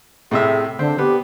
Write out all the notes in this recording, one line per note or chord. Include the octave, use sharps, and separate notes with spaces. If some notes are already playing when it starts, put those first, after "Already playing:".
A2 C3 G#4 E5
D3 C4
B3 G4